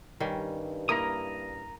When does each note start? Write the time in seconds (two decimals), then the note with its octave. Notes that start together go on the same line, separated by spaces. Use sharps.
0.20 G2 D#3 G3 C#4
0.89 A#3 E4 A#4 A#5 D#6